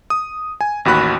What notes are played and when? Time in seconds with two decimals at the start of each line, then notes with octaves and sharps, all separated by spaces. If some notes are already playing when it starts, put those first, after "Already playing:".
0.10 D#6
0.61 G#5
0.85 A1 D#2 F#4 B5 F#6